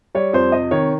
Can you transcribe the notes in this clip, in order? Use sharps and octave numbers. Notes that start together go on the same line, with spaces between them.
G3 C#5
F2 C5
C3 D#5
D#3 C#5